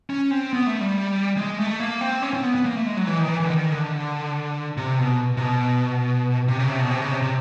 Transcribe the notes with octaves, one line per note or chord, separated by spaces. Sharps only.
C#4
C4
B3
A3
G3
G#3
A3
A#3
C4
C#4
C4
B3
B3
A#3
A3
G#3
F#3
E3
D#3
E3
E3
D3
D#3
D3
C3
B2
C3
B2
C3
C#3
C3
B2
C3
C#3
C3
C3